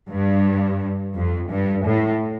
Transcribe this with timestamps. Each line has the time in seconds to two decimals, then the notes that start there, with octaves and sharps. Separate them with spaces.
0.09 G2
1.15 F2
1.50 G2
1.85 A2